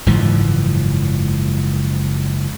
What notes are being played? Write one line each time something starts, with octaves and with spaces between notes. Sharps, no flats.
F#1 G#2 E3 F3